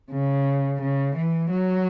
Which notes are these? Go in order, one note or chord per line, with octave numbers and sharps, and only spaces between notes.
C#3
C#3
E3
F#3